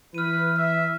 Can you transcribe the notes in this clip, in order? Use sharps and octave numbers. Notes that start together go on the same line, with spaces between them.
E3 B4 F6 D#7
E5